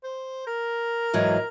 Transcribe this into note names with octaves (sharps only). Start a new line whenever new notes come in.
C5
A#4
G#2 E3 F#3